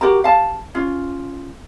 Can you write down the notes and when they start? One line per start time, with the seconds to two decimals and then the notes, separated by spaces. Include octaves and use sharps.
0.01 F#4 G4 A#4 A#5
0.24 F5 A5
0.75 C#4 F4